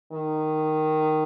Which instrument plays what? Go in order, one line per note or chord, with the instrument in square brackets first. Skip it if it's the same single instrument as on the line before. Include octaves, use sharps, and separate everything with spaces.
[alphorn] D#3